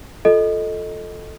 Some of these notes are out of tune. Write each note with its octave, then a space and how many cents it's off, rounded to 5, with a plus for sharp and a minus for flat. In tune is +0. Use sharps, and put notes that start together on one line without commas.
F4 +20 A4 +0 D#5 +0